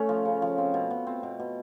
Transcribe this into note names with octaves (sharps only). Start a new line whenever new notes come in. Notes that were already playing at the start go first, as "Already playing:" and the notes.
Already playing: A3 C#4
F3
C#3
F3
C4
B2
B2
C4
B2
B2